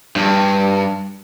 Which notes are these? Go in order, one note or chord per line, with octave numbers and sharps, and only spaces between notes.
G2